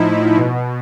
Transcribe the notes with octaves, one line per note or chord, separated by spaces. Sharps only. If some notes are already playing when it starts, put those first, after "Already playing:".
Already playing: A2 F3 D#4 E4
B2